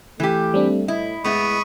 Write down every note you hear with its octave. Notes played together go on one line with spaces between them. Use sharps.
E3 A3 G4
G3 C4 D4
A2 E4 D#5
A2 G#3 B3 E4 B5 C#6 D#6